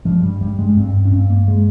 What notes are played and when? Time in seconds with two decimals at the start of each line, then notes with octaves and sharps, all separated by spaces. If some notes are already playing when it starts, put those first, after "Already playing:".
0.05 G2 F3
0.23 G3
0.41 G2 G3
0.59 G#3
0.77 G2 C4
1.05 C#4
1.12 G2 C4
1.30 A#3
1.48 G#3